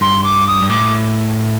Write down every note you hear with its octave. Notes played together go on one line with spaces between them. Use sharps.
G2 C6
D6
D#6
G2
A2 D6